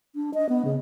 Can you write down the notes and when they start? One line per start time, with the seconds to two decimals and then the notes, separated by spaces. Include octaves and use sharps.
0.15 D4
0.34 D#5
0.49 B3
0.65 C#3